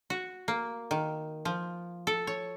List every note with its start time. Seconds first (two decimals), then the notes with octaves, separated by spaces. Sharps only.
0.10 F#4
0.48 A#3
0.91 D#3
1.45 F3
2.07 A4
2.27 C#5